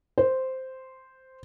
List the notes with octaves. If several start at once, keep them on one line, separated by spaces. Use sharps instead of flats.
C5